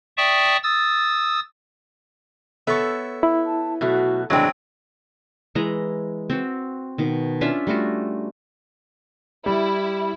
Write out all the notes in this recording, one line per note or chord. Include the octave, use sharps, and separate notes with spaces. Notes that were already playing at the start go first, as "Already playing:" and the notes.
D5 E5 G5 A5 C#6 D#6
D#6 E6 A6
B3 A4 C#5 E5 C#6
E4
A5
B2 F#3 A3 F#4
E2 A2 F#3 G#3 C4 D4
E3 G#3 A#5
C4 F#4
B2 D#3
C#4 D4 F4 E5
G3 A3 F4 F#4
G3 E4